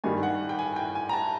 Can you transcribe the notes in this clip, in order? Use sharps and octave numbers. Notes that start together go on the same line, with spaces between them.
G2 D#3 G3 G#5
F#5
G5
G#5
G5
G#5
A#5
A5